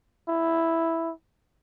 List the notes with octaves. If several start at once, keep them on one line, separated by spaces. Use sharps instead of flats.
E4